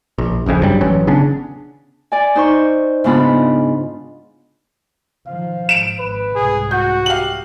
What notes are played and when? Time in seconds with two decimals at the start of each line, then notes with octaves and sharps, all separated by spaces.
0.18 A#1
0.46 D#1 A#1 F2 C#3
0.63 G2 F#3 G3
0.81 A1 E3 F#3 C#4
1.07 C#3 B3 C#4 D4
2.12 D5 G#5
2.35 D#4 C5 C#6
3.04 G#2 C#3 B3 D4 F4 B5
5.27 D#3 F3 F5
5.69 G#2 D7 E7
5.99 G#1 B4
6.35 C2 G#2 G#4
6.71 F#4 F#5 G6
7.06 G4 F5 F#7